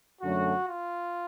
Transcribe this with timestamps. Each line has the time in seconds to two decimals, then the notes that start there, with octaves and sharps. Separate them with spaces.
0.22 F#2 D3 F#3 A3 F#4
0.68 F4